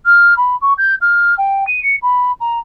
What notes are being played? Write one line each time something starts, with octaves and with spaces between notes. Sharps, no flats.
F6
B5
C#6
G6
F6
G5
D#7
C#7
B5
A#5